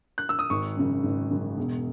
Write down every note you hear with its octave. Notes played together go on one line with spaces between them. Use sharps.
F#6
E6
D#6
G#1 C#6
F#2 C#3
G#1
F#2 C#3
E1